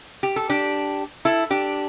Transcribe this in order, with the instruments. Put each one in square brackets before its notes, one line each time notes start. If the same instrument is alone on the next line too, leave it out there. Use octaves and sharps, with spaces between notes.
[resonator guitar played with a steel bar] G4
A4
D4 G4
E4 A4
D4 G4